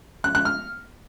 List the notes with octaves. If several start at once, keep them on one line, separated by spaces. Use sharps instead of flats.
F#6
F#6
F6